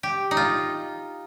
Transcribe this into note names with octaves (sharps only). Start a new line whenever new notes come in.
G4
D#4
F4